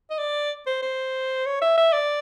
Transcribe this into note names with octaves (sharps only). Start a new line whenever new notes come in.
D#5
D5
C5
C5
C#5
E5
E5
D5